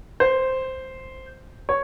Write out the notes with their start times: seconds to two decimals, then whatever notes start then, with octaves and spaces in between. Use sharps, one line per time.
0.20 C5
1.69 C#5